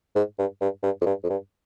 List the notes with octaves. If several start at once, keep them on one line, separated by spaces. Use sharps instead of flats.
G#2
G2
G2
G2
F2
G2
F2
G2